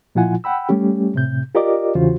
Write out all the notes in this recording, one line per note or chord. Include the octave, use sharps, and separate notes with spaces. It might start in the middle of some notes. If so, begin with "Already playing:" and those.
A#2 F3 E4 F4 F#5 G#5
F#5 G5 B5 E6
G3 A3 C#4 G4
A2 C3 G6
F4 G4 A#4 D5 D#5 D6
E2 C#3 E3 F4 F#4 C5